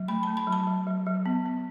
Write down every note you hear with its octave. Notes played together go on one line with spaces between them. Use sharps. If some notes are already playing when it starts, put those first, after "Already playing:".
Already playing: F#3
A3 B5
A3 A5
B5
F#3
A5
F#3
F#3
F#3
B3
B3